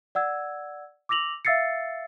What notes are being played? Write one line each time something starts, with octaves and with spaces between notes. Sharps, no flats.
D5 F#5 E6 G#6
D6 E6 A#6 F7 F#7
E5 F5 E6 A6 C7 C#7